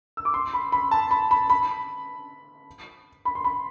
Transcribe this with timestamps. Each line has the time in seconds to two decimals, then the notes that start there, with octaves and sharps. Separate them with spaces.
0.17 E6
0.25 D6
0.34 C6
0.54 B5
0.72 B5
0.91 A5
1.11 B5
1.31 B5
1.50 B5
3.25 B5
3.35 C6
3.44 B5